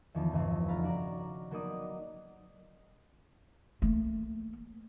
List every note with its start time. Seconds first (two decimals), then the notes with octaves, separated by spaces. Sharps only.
0.14 E2 D#3 F3 B3
0.32 G1 C#2 C4
0.68 F1 F4 F5 F#5 A#5 B5
0.83 C#4 F#4 D5 A#5
1.51 F#3 A#3 B3 D#4 D5 D#6
3.82 A3 A#3